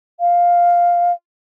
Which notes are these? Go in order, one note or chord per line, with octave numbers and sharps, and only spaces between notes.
F5